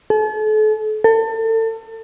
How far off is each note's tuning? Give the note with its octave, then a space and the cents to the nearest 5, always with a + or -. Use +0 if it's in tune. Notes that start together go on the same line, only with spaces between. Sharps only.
A4 -40
A4 +30